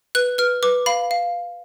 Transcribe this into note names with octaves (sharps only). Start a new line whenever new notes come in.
B4 F#6
B4 F6
B4 D6
F5 B5
F5